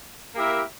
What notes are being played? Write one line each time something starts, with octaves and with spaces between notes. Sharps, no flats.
A#3 E4 G4 A#4 E5